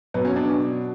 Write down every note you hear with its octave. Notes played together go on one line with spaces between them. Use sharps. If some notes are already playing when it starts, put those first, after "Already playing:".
B2 F#3 B3
C#4
D4